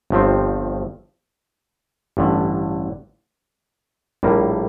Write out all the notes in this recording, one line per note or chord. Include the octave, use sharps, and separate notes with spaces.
G1 G2 F3 C4
A1 G2 D3
A#1 A2 G3 A#3